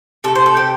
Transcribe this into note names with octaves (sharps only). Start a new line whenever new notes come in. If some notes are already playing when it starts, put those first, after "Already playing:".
C3 A3 A4
C5
A4
G4